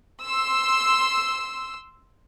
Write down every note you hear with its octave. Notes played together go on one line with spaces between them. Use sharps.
C6 E6